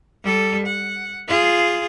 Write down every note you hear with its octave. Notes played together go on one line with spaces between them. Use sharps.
G3 A4
F#5
F4 G#4